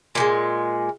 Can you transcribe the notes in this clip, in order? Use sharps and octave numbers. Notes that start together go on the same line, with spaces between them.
A#2 F3 G#3